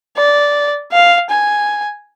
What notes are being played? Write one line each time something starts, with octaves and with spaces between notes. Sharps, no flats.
D5
F5
G#5